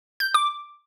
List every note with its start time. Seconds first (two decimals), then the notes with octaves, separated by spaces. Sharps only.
0.20 G6
0.34 D6